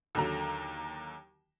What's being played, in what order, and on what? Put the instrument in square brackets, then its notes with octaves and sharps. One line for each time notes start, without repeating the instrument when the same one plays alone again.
[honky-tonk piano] D#2 D3 F#3 A#5